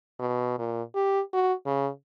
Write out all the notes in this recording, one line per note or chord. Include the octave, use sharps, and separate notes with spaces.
B2
A#2
G4
F#4
C#3